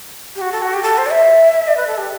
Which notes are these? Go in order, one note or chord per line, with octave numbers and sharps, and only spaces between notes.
G4
F#4
A4
F#4
G4
A4
C5
D5
E5
D5
B4
A4
G4